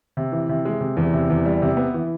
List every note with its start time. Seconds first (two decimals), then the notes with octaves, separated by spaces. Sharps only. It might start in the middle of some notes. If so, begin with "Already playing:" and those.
0.17 C3
0.32 E3
0.49 C3
0.65 G#3
0.80 C3
0.97 E2
1.13 C3
1.30 E2
1.45 G3
1.62 C3
1.77 B3
1.94 E3